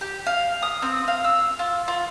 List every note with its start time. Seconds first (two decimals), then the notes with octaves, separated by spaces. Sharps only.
0.01 G4
0.26 F5
0.62 D#6
0.82 C4
1.08 F5
1.24 E6
1.59 F4
1.88 F4